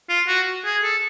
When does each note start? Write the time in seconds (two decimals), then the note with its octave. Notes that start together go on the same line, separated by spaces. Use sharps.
0.09 F4
0.28 F#4
0.65 G#4
0.83 A4